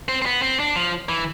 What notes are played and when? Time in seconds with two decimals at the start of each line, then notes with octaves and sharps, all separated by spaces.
0.09 C4
0.22 C4
0.26 B3
0.42 C4
0.60 D4
0.76 F3
1.09 E3